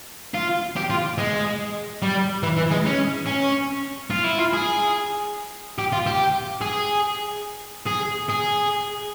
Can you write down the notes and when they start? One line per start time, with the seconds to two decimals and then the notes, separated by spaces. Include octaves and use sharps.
0.34 F4
0.76 G4
0.90 F4
1.18 G#3
2.02 G3
2.43 E3
2.57 E3
2.71 G#3
2.86 C#4
3.27 C#4
4.10 F4
4.24 E4
4.38 F4
4.53 G#4
5.79 G4
5.93 F4
6.07 G4
6.61 G#4
7.87 G#4
8.30 G#4